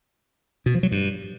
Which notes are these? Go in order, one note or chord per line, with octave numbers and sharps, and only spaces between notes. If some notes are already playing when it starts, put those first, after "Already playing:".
B2
F3
F#3
G2